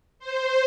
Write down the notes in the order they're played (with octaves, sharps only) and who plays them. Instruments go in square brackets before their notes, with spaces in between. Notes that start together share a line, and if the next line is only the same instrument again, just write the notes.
[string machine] C5